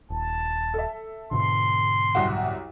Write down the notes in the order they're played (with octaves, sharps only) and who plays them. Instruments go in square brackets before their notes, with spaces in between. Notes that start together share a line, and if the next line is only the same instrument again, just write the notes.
[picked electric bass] D#1 [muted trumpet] A5
[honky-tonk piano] A4 E5
[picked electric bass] G#2 B2 D3 [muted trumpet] C6
[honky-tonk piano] C2 F#2 F#4